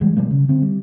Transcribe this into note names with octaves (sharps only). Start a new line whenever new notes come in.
E3 G3 G#3
B2 F3 G3 A#3
C#3
D3 C4
G3